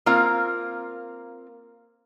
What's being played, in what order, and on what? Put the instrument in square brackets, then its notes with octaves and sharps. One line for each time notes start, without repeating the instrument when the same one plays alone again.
[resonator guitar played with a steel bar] A#3 C4 F4 A#4